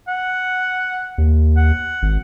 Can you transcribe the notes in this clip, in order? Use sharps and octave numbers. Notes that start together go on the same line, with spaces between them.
F#5
D#2
F#5
G#1